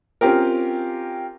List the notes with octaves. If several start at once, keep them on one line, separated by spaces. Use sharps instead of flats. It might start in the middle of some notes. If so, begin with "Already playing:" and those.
C4 C#4 F4 G4 A#4